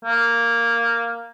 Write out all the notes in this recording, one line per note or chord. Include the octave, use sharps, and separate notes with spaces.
A#3